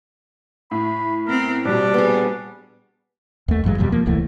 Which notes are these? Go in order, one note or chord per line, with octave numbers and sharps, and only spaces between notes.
A2 B5
B3 C4 A#4
A#1 B2 G3 D4
B3 G#4
D#2 A3
A1 G2 F#3 G#3
D#1 F2 B2 G3
F3 A#3
D#1 C2 E3 A3